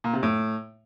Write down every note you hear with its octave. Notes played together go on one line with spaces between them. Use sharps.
A#2
C3
A2